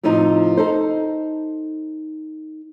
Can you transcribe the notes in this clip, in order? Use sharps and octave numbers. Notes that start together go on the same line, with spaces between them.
A2 C3 F3 D#4
D#4 A4 C5